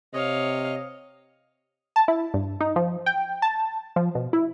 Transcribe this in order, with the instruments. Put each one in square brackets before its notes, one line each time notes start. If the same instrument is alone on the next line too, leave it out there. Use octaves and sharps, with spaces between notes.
[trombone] C3 [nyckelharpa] C#5 F5 [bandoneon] D#5
[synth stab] A5
E4
G2
D#4
F3
G5
A5
F3
B2
E4